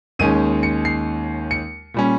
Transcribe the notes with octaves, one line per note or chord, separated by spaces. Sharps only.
D#2 D#3 G#3 C#4 D#7
C#7
C7
C#7
A#2 G3 C#4